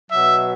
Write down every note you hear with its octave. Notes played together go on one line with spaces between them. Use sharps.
B2 F#3 E5